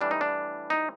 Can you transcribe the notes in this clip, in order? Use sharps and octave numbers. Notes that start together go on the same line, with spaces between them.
A2 E3 G3 D4
D#4
D4
D#4